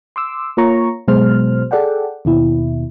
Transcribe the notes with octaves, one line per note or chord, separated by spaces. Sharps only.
C6 D6 E6
A#3 F4 C#5 A#5 C#6
G1 B2 F#3 G#3 C5 F6
G#4 A4 D5 F#5 G5
D#2 B2 E4